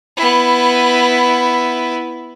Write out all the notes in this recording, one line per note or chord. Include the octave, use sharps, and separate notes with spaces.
B3 E4